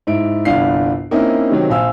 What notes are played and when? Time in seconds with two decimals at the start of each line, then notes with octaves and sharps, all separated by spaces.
0.07 G#2 E4 D7
0.45 G1 C2 D4 F5 C7
1.11 A#3 C4 C#4 D#4 E4
1.50 C3 D#3 F#3 C4
1.70 A#1 C5 F5 G#5 E6